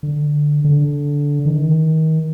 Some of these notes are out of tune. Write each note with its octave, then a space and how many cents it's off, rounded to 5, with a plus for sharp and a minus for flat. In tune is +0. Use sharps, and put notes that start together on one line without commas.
D3 +10
D3 -15
D#3 +30